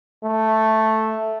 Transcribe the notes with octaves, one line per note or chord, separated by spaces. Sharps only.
A3